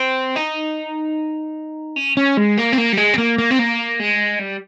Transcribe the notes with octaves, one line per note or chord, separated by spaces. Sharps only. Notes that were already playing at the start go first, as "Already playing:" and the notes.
Already playing: C4
D#4
C#4
C#4
G#3
A#3
C4
A#3
G3
G#3
C4
A#3
A#3
C4
A#3
G#3
G3